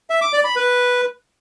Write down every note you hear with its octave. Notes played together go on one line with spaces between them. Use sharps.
E5
D6
D5
B5
B4